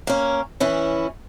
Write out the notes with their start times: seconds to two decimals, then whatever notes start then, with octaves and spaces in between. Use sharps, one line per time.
0.07 A#3 C#4
0.60 E3 C#4 E4